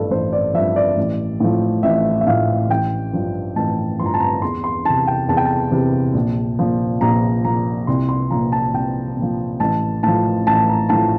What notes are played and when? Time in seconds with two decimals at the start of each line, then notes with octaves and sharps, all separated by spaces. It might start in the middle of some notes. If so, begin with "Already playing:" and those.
Already playing: A1 G2 F3 A4
0.11 A1 C5
0.33 D5
0.54 G2 F3 E5
0.76 D5
0.97 A1
1.40 A2 F3
1.83 A1 E5
2.21 E5
2.27 A2 F3 F5
2.69 A1 G5
3.13 G2 F3
3.56 A1 A5
3.99 G2 F3 C6
4.06 A#5
4.14 A5
4.20 A#5
4.42 E2 C6
4.64 C6
4.85 C3 E3 A5
5.07 G5
5.29 E2 A5
5.37 G5
5.46 A5
5.71 C3 E3
6.14 A#1
6.59 A#2 F3
7.01 A#1 A#5
7.44 A#2 F3 A#5
7.87 C2 C6
8.09 C6
8.30 A#2 F3 A#5
8.52 A5
8.74 C2 G5
9.17 A#2
9.22 F3
9.60 A1 A5
10.03 A2 F3 A5
10.47 A1 A5
10.69 A#5
10.89 A2 F3 A5